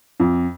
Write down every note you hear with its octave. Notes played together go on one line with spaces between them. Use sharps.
F2